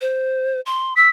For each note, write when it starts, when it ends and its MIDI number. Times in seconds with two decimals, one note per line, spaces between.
0.01 0.60 72
0.66 0.96 84
0.96 1.08 88
0.96 1.09 95